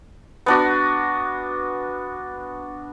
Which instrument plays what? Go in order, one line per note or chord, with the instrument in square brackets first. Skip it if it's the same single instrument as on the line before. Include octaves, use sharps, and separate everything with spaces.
[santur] B3 D4 F#4